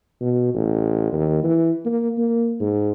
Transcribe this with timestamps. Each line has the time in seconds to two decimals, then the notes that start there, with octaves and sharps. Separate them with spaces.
0.21 B2
0.54 A1
1.12 D#2
1.44 E3
1.85 A#3
2.18 A#3
2.60 G#2